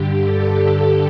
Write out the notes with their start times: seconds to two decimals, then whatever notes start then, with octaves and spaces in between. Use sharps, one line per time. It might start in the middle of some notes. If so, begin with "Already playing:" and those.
Already playing: G2 D3 G4
0.23 A4